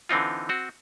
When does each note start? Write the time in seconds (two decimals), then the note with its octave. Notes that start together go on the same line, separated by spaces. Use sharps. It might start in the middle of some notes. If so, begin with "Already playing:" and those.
0.09 D3 E3 C4 D#4 F4
0.49 C4 F#4